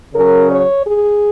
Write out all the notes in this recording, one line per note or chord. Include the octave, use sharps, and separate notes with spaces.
C#3 F#3 C#4 A#4
C#5
G#4